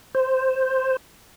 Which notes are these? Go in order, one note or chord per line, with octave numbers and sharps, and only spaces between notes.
C5